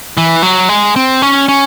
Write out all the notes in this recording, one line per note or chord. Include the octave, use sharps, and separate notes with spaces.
E3
F#3
G#3
C4
C#4
C#4